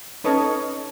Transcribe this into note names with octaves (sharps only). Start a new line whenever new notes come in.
C#4 D#4 A4 B4 C#5 D#5